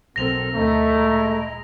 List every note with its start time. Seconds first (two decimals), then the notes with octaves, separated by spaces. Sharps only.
0.16 B1 B2 C4 A4 A#4 A#6 F7
0.54 D2 D#3 A3 E4 D#5 A#5
0.88 A#2 G#3